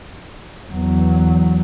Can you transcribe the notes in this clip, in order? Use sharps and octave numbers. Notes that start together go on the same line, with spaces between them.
E2 F#3